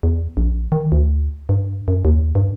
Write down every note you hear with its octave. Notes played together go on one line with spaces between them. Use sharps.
E2
A#1
D#3
D2
G2
F#2
D#2
G2